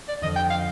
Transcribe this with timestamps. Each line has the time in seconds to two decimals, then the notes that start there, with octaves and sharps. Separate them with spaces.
0.08 D5
0.22 F2 D3 F3 D#5
0.36 G5
0.50 F5